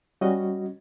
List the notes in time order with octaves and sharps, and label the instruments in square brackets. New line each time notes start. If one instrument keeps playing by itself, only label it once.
[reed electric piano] G3 C#4 F#4 D#5